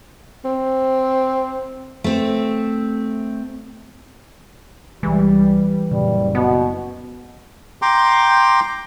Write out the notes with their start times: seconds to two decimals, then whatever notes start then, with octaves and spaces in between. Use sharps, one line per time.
0.44 C4
2.04 A3 C4
5.03 C2 E3 G3 G#3
5.91 F#1 A#2 C#3 G3
6.35 B2 B3
7.82 G5 A#5 C6 D6